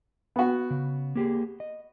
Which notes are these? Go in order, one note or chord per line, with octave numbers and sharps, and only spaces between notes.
B3 F#4
C#3
A#3 G4 G#4
D#5